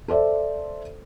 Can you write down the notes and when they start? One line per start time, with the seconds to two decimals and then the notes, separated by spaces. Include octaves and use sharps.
0.08 A4 C5 D5 E5